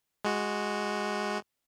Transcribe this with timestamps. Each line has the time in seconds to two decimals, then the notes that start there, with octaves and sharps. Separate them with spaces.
0.25 G#3 F#4